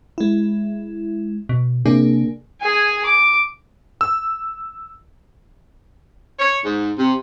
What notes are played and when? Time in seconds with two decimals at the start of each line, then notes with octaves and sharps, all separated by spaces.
0.18 G#3 E4
1.49 B2
1.86 C3 A#3 D4 G#4
2.61 G#4 G#5
3.06 D6
4.01 E6
6.39 C#5
6.63 G#2
6.98 C3